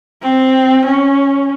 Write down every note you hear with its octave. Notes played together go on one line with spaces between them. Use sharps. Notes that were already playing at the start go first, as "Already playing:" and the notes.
C4
C#4